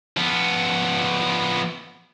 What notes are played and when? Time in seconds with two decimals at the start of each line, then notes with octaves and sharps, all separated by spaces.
0.17 F3 B3